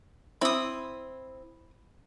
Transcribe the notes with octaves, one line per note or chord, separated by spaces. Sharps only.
C4 E4 B5 D#6